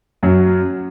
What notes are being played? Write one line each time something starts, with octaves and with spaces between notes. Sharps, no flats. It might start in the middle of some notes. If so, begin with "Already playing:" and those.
F#2 F#3